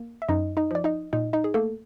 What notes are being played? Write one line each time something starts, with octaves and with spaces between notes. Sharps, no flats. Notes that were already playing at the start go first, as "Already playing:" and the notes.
Already playing: A#3
E5
F#2 D#4 D#5
D#4 D#5
F3 D5
D#4 D#5
A#2 D#4 D#5
D#4 D#5
G#4
A3 A#3 A4